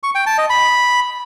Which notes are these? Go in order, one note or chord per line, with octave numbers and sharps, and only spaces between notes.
C#6
G5
A5
D#5
B5